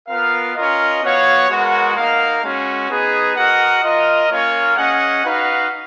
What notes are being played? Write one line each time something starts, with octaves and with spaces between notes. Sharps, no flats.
B3 F4 A#4 F5
C#4 F4 A#4 D#5
B3 F#4 C#5 F5
G#3 B3 F#4 A#4
A#3 D#4 A#4 F5
G#3 C#4 F#4
B3 D#4 G#4 B4
F#4 A#4 D#5 F#5
F4 A#4 D#5
A#3 C#4 F4 A#4 C#5
C#4 G#4 D#5 F#5
D#4 F#4 B4 F5